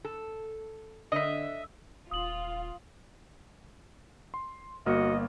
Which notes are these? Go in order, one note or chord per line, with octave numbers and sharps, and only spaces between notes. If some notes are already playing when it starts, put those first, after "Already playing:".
A4
D3 D#5 E5
D#1 F4 D#6 F#7
C6
G1 A#3 F#4 D#5 F6